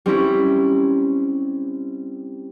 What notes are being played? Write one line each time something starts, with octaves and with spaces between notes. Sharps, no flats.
G3 C4 C#4 E4